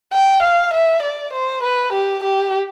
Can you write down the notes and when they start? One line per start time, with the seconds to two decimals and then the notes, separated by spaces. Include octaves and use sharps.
0.13 G5
0.43 F5
0.73 E5
1.03 D5
1.33 C5
1.63 B4
1.93 G4
2.23 G4